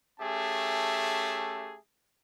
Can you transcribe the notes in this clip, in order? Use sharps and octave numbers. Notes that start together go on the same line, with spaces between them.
A3 C#4 G4 G#4 E5 A5